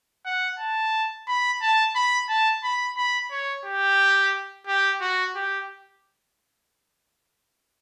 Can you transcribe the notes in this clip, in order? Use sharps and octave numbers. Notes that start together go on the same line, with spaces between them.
F#5
A5
B5
A5
B5
A5
B5
B5
C#5
G4
G4
F#4
G4